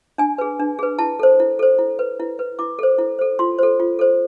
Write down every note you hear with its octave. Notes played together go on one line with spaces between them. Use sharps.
D4 G#5
G#4 B4
D4
G#4 B4
E4 A5
A4 C5
E4
A4 C5
E4
B4
E4
B4
E4 D6
A4 C5
E4
A4 C5
F4 C6
A4 C5
F4
A4 C5